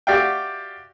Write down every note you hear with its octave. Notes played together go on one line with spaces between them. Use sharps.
F#4 G4 D5 E5 F5 G5